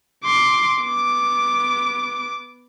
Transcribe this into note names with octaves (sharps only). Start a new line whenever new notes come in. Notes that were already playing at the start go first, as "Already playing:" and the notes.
C6 D6
B3 D6